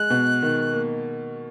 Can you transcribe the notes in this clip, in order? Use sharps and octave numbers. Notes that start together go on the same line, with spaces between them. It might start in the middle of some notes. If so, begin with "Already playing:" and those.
Already playing: G#3 F#6
B2
D#3
A#3